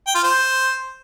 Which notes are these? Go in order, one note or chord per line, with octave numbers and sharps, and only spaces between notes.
G5
F4
C5